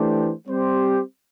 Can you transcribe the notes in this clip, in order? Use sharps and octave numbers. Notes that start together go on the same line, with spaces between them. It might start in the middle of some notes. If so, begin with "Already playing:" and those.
Already playing: E3 A3 D4 G4 C5
G3 C4 G4 C5